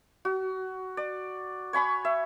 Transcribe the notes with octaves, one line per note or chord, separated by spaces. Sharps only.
F#4
D5
C#5 G#5 B5 C#6
E5